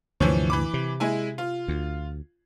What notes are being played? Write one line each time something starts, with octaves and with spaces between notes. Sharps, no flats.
D2 G2 C3 E3 F3 C#5
E3 B5 D6
C3
G#3 E4 G#5
F4
D2